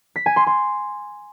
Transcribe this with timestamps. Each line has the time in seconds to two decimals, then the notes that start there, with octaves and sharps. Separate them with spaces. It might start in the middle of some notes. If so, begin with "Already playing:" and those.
0.16 B6
0.26 G#5
0.36 C6
0.47 C6